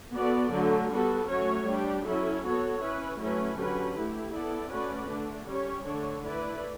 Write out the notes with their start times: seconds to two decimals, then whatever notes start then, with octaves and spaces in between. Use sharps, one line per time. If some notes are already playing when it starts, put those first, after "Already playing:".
0.14 B3 F#4 A4 D5
0.52 D3 F#3 A3
0.90 G3 B3 F#4 A4
1.28 F#3 A3 C#4 F#4 C#5
1.66 G3 D4 G4
2.05 F#3 C#4 E4 A4
2.43 B3 F#4 A4 C#5
2.80 C#4 E4 B4
3.19 F#3 A3 C#4 E4 B4
3.57 D3 F#3 C#4 G4 B4
3.95 A3 E4 G4
4.33 B3 E4 A4 D5
4.71 A3 C#4 F#4 B4 D5
5.09 D3 A3 D4
5.48 G3 C#4 G4 C#5
5.85 D3 A3 D4 A4 C#5
6.24 A3 E4 B4 D5